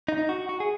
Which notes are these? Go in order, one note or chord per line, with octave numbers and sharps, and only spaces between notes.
D#4
F#4
F#4
G#4